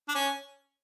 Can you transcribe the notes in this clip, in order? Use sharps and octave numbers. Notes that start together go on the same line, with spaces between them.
D4
C#4